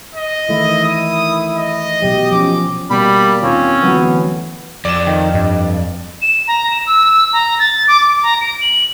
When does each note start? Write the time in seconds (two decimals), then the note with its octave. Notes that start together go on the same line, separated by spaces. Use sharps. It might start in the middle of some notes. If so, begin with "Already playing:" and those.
0.15 D#5
0.49 D#3 E3 A3 E4
0.84 D#6
1.57 D#5
2.02 B2 F#3 G4
2.32 F3 C#4 D6
2.90 B2 G3 A#3 B5
3.42 D#2 C4 C#4 F4
3.83 D2 E3 F#3 B3
4.85 F2 D5 E7
5.07 D#3 D#5 G5
5.34 G2
6.22 E7
6.48 A#5
6.71 E7
6.87 E6
7.33 A#5
7.59 A6
7.88 D6
8.00 D6
8.23 A#5
8.41 D7
8.61 F#7